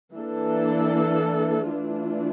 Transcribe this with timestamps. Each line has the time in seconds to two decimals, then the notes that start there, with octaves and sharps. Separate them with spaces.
0.14 E3 A#3 D4 A4
1.71 E3 A3 D4 F4